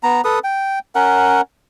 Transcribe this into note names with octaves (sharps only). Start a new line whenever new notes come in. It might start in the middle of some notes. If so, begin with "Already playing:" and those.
B3 A#5
A4 B4 D#6
G5
C#4 A#4 F#5